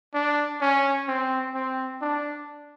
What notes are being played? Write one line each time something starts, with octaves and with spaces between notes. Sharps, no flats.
D4
C#4
C4
C4
D4